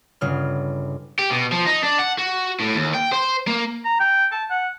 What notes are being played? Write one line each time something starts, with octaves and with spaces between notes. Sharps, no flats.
G1 C#3 F6
G4
B2
F3
D#4
D4
F#5
F#4
A2
D#2
G5
C5
A#3
A#5
G5
A5
F#5